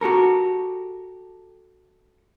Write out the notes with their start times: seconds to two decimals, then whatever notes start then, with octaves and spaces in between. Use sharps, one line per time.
0.01 F#4 G4 A4 A#4